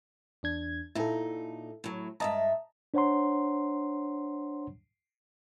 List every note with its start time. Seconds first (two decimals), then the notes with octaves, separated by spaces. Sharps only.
0.43 E2 D4 G#6
0.95 A#2 D#4 E4 A4
1.84 A2 F#3
2.20 G2 G#3 D#5 E5 A5 A#5
2.94 D4 C5 C#5 F#5 A#5 C6